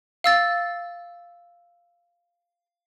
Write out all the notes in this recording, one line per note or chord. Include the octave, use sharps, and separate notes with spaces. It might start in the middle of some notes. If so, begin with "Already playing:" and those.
F5 E6 A6